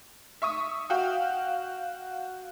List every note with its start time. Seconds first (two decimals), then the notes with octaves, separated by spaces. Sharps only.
0.42 E5 C#6 D#6
0.90 F#4 F5 G5